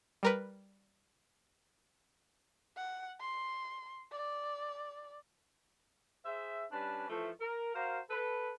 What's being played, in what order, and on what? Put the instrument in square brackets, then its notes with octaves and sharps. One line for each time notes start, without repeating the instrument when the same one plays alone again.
[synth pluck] G3 A#4 B4
[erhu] F#5
C6
D5
[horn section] G#4 C5 E5
G3 C#4 D4 B4 A5
E3 F3 A3
A#4
F#4 A#4 C5 F5 A#5
A4 B4